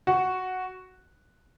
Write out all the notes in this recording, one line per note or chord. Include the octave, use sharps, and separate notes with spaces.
F#4